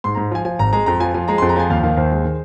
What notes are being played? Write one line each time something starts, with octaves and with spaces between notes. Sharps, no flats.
G#2 C6
G#2 A#5
F3 G#5
F3 G#5
G#1 A#5
G#3 A#5
F2 A#5
F3 G#5
F3 G#5
G#3 A#5
F2 C6
A#5
F3 G#5
D#2 F5
D#3 F5
D#2 C5
G#3
D#3